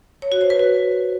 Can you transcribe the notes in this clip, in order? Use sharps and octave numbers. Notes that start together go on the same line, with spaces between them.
C#5
F#4
C5
B4
F#4